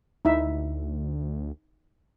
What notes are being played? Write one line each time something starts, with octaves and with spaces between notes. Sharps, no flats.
D2 D#4 E4 E5